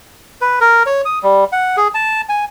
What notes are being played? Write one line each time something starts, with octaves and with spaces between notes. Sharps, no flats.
B4
A#4
C#5
D#6
G3
F#5
G#4
A5
G#5